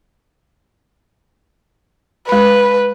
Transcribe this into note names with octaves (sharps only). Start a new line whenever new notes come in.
G#3 B4 B5